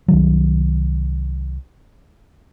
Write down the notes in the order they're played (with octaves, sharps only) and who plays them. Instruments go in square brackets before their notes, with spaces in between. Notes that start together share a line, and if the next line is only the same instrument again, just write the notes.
[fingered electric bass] C2 D#3 F#3